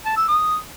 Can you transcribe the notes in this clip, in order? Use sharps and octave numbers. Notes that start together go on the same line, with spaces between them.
A5
E6
D#6